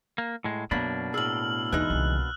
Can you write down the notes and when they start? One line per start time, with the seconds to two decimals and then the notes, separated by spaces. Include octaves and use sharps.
0.18 A#3
0.44 A2 G#3
0.71 F#2 B2 A#3 B3 D4 B5
1.14 A2 G#4 E6 F6 F#7
1.73 D#2 E3 G#3 D#4 F#6
1.90 C2 C#3